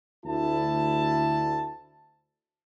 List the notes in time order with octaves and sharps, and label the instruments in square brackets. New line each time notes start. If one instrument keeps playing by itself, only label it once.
[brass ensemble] D2 E4 A5